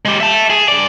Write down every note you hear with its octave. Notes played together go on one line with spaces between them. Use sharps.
G#3 G4
E5 A5
G#4
G2 D5